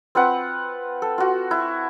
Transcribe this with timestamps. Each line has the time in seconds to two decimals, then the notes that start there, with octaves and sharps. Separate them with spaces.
0.15 C4 F4 B4 F#5
1.02 A4
1.18 F4 F#4
1.51 E4